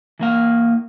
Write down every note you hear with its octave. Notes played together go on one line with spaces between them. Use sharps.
E3 A#3 F5